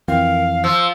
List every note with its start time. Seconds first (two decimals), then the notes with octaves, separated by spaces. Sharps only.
0.08 F2 E3 C4 A#4 F5
0.64 F3 E6